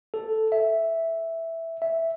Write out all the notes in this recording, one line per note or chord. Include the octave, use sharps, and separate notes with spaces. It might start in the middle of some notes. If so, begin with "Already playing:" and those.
A4
E5
E5